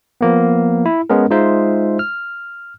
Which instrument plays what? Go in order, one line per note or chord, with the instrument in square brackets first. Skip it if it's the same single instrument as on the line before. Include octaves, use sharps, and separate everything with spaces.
[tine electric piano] F3 A#3 B3
E4
G#3 B3 C#4 A#4
G#3 D#4 F4 C5 E5
F6